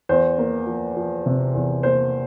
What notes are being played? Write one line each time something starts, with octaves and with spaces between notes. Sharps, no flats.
E2 C5
A#3
F3
F3
C3
E2
A#3 C5